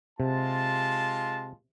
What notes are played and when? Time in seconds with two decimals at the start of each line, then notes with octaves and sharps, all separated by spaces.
0.20 C3 G#3 F4 A5